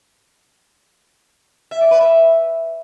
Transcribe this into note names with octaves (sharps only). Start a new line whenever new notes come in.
E5
D5
B4
E5